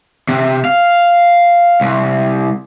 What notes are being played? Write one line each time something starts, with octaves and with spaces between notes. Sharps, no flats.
C3
F5
C2